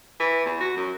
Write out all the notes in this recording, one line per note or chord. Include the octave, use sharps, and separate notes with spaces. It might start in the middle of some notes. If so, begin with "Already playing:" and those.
E3
E2
F#4
F#2